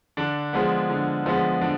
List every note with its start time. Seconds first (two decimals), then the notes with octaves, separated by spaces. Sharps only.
0.17 D3 D4
0.53 F3 G#3 B3
0.89 D3
1.26 F3 G#3 B3
1.61 D3 D4